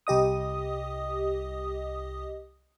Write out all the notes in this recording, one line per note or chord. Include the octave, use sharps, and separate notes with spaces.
C2 G4 D#5 D#6